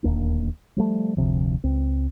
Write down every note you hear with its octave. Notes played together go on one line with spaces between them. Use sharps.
D1 D#2 A#3 D4
F3 G3 A3
F1 D2 C3 F3
C#2 C4